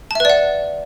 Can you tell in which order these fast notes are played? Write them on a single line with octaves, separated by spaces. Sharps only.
A5 E5 B4 D5 F#5